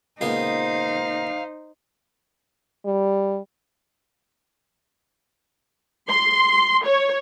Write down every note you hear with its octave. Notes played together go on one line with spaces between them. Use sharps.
C#2 A#2 B3 D#4 C5 F5
G3
C6
C#5